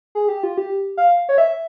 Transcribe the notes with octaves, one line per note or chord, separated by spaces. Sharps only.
G#4
G4
F4
G4
F5
C#5
E5